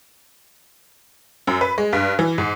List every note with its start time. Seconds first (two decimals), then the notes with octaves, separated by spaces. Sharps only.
1.47 F#2
1.61 B4
1.78 G#3
1.93 G2
2.19 E3
2.38 G#2